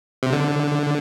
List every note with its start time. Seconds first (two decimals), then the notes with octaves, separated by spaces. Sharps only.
0.23 C3
0.32 D3